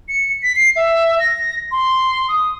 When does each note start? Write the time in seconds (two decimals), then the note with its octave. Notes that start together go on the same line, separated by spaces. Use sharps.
0.09 C#7
0.43 B6
0.56 C7
0.76 E5
1.19 A#6
1.72 C6
2.28 D#6